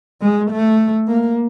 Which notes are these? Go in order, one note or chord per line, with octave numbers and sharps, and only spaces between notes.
G#3
A3
A#3